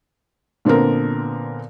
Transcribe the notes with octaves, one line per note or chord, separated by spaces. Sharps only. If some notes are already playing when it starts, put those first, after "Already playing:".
A#2 D3 B3 C4 A#4